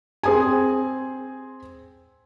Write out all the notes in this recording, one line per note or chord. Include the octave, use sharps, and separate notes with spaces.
C4 G#4 G#5